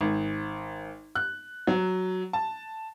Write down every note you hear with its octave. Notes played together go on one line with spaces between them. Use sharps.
G#1
F#6
F#3
A5